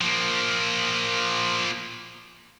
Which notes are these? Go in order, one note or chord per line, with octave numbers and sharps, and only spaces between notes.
F3 A#3